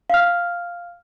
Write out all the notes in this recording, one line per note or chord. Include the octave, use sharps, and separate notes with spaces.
F5 F6